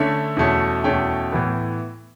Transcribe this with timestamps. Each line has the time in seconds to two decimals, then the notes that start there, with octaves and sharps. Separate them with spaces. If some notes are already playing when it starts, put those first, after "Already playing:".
Already playing: D3 A3 C#4 E5
0.37 E2 B2 A3 C#4
0.84 E2 B2 A3 C#4 G5
1.32 A2 E3 B3